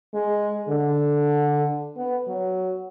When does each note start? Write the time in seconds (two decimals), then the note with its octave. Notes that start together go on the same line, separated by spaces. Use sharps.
0.14 G#3
0.69 D3
1.97 B3
2.28 F#3